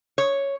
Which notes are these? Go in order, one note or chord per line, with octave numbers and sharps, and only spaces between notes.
C#5